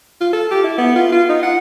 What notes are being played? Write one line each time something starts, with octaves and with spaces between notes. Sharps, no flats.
F4
A4
G4
E4
B3
F4
F4
D#4
F#5